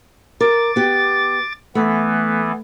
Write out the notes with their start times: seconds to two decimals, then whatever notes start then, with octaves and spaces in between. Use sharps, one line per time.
0.41 A#4 D6 A6
0.76 B3 G4
1.75 E3 A3 B3